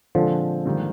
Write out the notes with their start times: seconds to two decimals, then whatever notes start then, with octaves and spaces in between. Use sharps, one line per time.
0.15 A#2 D3 F3 G#3 C4
0.65 G#2 D#3 G3 A#3